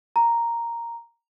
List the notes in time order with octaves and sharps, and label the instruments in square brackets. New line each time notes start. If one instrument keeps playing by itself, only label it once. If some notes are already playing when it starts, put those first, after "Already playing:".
[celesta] A#5